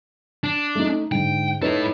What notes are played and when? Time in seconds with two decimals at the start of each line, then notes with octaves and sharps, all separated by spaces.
0.44 D4
0.75 A3 D#4
1.12 G#2 D3 G5
1.62 D#4 E4 A4 B4 C#5